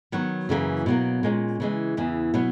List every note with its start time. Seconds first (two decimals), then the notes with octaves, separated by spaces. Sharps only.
0.12 D#3 F#3 B3 F#4
0.49 F#2 C#3 E3 A#3
0.86 B2 F#3 A#3
1.23 A#2 G#3 C#4
1.60 C#3 E3 G#3
1.97 E2 C#3 E3
2.34 B2 F#3 B3